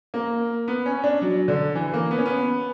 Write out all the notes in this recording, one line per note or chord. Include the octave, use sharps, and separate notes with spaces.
A#3
B3
C#4
D4
F#3
D3
E3
A#3
B3
C#4
B3